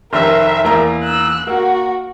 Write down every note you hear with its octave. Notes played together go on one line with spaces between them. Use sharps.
F1 D#3 A#4 E5 E6
E2 A#3 A#5
E6 F#6
A#3 F#4